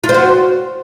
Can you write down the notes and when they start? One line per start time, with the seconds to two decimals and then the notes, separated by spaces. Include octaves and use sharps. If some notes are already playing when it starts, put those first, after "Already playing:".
0.04 F4
0.09 C5
0.14 F#4